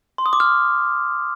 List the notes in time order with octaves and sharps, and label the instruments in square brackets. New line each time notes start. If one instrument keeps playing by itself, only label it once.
[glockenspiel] C6
D#6
D6
F6